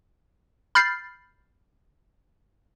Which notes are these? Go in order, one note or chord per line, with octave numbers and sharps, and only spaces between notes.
B5 F6 G6 A6 C7